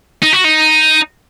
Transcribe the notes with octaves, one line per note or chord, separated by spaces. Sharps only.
D#4
F#4
D#4